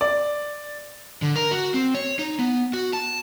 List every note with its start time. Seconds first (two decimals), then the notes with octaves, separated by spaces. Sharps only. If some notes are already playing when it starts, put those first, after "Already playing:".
0.01 D5
1.22 D3
1.36 A#4
1.51 F#4
1.74 C4
1.95 C#5
2.19 D#4
2.39 B3
2.73 F#4
2.93 A5